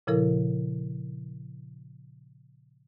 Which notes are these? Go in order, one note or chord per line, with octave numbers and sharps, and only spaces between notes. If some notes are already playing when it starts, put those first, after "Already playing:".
A#2 C#3 F3 E4 A4 A#4